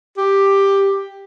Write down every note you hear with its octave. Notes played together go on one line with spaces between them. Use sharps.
G4